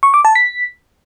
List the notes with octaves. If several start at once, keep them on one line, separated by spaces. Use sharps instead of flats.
C#6
D6
A5
B6